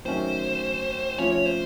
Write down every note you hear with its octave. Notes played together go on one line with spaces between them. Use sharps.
D#3 F#3 A3 C#4 C5
F3 A3 C#4 F4 C#5
C#5
C5